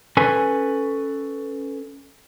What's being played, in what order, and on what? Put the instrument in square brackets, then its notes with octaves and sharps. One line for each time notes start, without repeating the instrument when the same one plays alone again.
[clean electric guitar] C#4 A4 B4 G#5